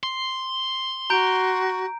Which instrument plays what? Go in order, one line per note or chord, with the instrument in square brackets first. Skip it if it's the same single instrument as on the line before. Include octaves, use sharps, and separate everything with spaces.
[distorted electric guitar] C6
[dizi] F#4 [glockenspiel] A#5 G6 D7